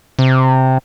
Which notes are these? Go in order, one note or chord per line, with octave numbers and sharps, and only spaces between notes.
C3